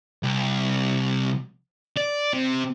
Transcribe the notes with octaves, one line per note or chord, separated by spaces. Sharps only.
C2
D5
C3